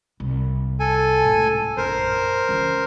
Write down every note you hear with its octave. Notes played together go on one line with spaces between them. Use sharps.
C2
A4 G#5
C#2 A2
A#1 F#2 A#4 C5
C#2 E3